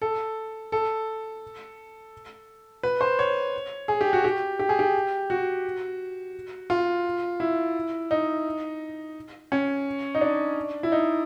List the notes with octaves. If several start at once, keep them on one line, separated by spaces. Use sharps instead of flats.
A4
A4
B4
C5
C#5
G#4
G4
F#4
G4
G4
G#4
G4
F#4
F4
E4
D#4
C#4
D#4
D4
E4
D#4